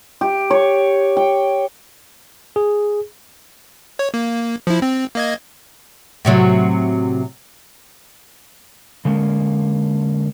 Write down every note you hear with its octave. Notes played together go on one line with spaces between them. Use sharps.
G4
C#5
G5
G#4
C#5
A#3
F3 E4
C4
A#3 D#5 G#6
A2 C3 F#3
D3 G#3 A#3 C#4